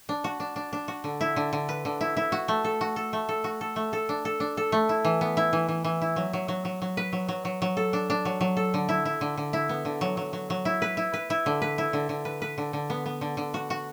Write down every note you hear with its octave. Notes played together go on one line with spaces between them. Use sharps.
D4
F#4
D4
D4
D4
F#4
D3
E4
D3
D3
B4
D3
E4
E4
F#4
A3
A4
F#4
A4
A3
A4
F#4
A4
A3
A4
D4
A4
D4
A4
A3
E4
E3
B3
E4
E3
E3
E3
E4
F#3
F#3
F#3
F#3
F#3
B4
F#3
F#3
F#3
F#3
A4
D4
D4
F#3
F#3
A4
D3
E4
E4
D3
D3
E4
B3
D3
F#3
F#3
F#3
F#3
E4
B4
E4
B4
E4
D3
B4
E4
D3
D3
B4
B4
D3
D3
B3
B3
D3
D3
F#4
F#4